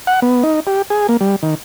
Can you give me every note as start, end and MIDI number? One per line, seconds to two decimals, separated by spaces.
0.07 0.20 78
0.22 0.43 59
0.43 0.60 63
0.67 0.82 67
0.90 1.07 68
1.09 1.17 58
1.21 1.36 55
1.43 1.55 51